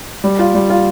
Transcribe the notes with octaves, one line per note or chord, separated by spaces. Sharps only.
G3
F4
G3
F4